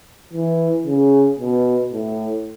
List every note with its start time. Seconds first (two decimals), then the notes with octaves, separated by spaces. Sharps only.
0.33 E3
0.86 C#3
1.39 B2
1.93 A2